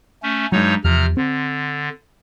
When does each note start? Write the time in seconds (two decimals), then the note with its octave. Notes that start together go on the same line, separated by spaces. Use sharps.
0.23 A3 C#4
0.52 G2 F#3 G#3 D#4 C#5
0.84 E2 C3 F3 A#5 F6
1.17 D3 C4